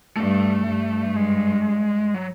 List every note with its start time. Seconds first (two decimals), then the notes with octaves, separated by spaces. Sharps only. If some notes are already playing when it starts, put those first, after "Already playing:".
0.16 G2 A3
0.65 G2
1.16 G#3
2.14 F#3